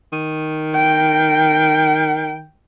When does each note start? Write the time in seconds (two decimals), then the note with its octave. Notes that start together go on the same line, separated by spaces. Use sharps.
0.13 D#3
0.75 G5